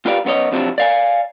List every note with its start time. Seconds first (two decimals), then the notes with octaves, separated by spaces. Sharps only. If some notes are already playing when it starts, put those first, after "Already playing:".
0.06 F4 G4 B4 D5 E5 F5
0.25 F#2 B3 F4 C#5 D#5
0.52 F2 C3 F3 F#3 D4 E4
0.78 D5 F5 G#5